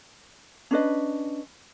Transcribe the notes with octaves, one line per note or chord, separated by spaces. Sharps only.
C#4 D4 B4 D#5